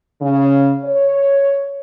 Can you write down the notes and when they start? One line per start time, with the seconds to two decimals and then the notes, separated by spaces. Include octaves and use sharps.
0.20 C#3
0.84 C#5